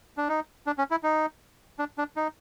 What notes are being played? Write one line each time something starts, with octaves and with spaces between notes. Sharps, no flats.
D4
D#4
D4
C#4
E4
D#4
D4
D4
D#4